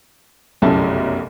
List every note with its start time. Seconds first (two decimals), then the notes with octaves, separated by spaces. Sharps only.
0.62 F1 B1 F#2 C#3 E4 A5